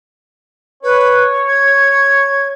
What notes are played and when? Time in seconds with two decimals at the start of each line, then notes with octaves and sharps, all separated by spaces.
0.84 B4 C#5
1.47 G#6